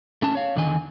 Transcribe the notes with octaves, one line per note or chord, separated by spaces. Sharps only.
A3 C#4 A5
C#5 F5
E2 D3 D#3 D#5 G#5